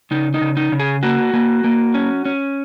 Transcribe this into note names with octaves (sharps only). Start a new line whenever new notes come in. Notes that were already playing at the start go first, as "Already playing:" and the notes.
C#3 D#4
D#4
C#3
D#4
C#3
G#4
A#3 F#4
A#3
A#3
C#4
C#4